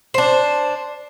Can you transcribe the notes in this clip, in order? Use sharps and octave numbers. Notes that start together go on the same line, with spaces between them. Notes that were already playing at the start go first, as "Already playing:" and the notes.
D4 C5